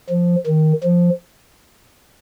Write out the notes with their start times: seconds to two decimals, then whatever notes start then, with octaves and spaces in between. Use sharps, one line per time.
0.10 F3
0.47 D#3
0.84 F3